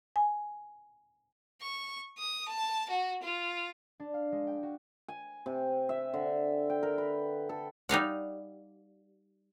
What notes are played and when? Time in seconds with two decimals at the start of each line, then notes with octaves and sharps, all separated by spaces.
0.16 G#5
1.61 C#6
2.18 D#6
2.48 A5
2.89 F#4
3.22 F4
4.00 D4
4.14 F5
4.32 G#3
4.47 G5
4.63 F#4
5.08 G#5
5.46 C3
5.89 E5
6.14 D3
6.70 G5
6.83 A#4
6.98 B4
7.49 A4
7.89 G3 D#4 F5 F#5